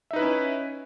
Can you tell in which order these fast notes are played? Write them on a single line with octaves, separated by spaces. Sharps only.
E5 D#4 B4 E4 C#4